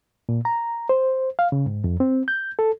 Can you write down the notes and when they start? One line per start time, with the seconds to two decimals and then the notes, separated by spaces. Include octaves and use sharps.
0.29 A#2
0.45 A#5
0.89 C5
1.39 F5
1.52 C#3
1.66 G#2
1.84 F2
2.00 C4
2.28 G6
2.59 A4